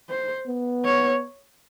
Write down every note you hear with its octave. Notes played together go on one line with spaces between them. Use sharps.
C5
B3
C#5